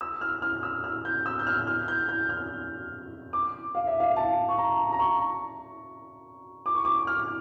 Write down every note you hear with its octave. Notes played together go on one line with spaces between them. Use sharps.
E6
F6
F6
E6
F6
G6
E6
G6
F6
F6
G6
G6
F6
D6
F5
E5
F5
A5
C#6
A#5
A#5
C#6
D6
C#6
D6
F6